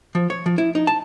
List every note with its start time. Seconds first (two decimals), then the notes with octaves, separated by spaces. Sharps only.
0.15 F3
0.30 C#5
0.46 F3
0.58 E4
0.75 D#4
0.87 A5